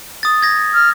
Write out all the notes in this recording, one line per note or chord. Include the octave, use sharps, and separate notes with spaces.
D#6 A6
G#6 A#6
F6